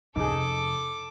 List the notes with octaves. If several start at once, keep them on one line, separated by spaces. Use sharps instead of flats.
F2 C3 D#4 G#4 A4 D6